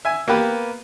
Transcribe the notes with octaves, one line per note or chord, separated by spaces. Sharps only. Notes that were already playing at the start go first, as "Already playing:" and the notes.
E5 G#5
A#3 B3 G4 B4